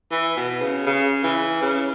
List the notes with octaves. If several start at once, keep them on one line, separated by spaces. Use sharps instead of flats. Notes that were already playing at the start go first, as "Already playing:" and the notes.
E3
B2
C#3
C#3
E3
C#3